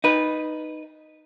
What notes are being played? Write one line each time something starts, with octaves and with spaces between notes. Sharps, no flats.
D#4 B4